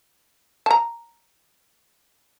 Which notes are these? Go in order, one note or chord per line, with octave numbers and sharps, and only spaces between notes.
A5 A#5